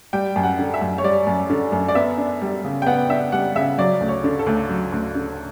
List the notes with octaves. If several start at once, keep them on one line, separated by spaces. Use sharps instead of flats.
G3 G5
F#2
F#5
D3
E5
F#2
C#5
G3 D5
F#2
D3
F#2
D5
B3 E5
D4
G3
C#3
G5
B3 F#5
D4 E5
G3 F#5
C#3 E5
F#3 D5
D2
C#5
D3
A4
D2
F#3
D2
D3